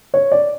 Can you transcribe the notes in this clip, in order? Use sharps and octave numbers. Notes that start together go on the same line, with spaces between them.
C#5
D5